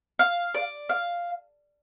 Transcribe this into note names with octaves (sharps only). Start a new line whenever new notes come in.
F5
D5
F5